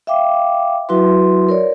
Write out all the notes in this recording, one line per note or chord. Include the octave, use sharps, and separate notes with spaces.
E5 F5 G5 D6
F#3 E4 F#4 B4 E5 C6
A#4 C#5 D5